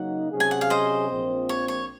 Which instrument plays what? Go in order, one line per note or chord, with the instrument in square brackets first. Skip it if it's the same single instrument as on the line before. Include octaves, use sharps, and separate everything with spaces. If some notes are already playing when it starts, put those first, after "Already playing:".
Already playing: [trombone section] C#3 F#3 A#3 D#4 [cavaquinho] F#5
[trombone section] C3 F#3 C#4 G#4
[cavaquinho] G#5
F#5
F5
C5 D#5
[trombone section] A#1 A#2 F3 C4
[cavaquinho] C#5
C#5